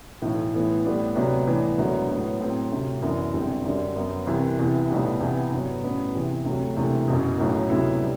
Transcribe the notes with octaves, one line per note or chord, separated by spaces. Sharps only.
B1 A2 E3 A3
A2 E3 B3 E4
A2 G3 B3 D4
D2 C3 F#3 B3 D4
A2 E3 B3 D4
E1 D2 D3 F#3 B3
A2 F#3 B3
A2 F#3 C4
D2 C3 F#3
F#2 E3 B3 D4
E1 E2 D3 G3 C4
F#2 D3 G3
F#2 F#3 B3
C2 C3 E3
E2 C3 E3 B3
B1 A2 G3 B3
E2 C3 E3 B3 E4
G1 G2 F#3 B3
A1 G2 F#3 B3
E2 C3 E3
D2 C3 F#3 A3
E1 E2 C3 E3 A3
F#1 E2 B2
B1 A2 F#3
D2 C3 F#3 B3 E4
G3